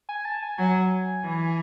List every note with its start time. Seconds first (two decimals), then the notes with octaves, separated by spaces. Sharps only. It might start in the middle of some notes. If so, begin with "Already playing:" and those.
0.09 G#5
0.25 A5
0.42 G#5
0.58 F#3 G#5
1.25 E3